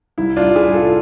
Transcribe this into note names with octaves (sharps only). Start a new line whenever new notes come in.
C2 E4
D4 F4
C2
E4 G#4
C2
F4 A4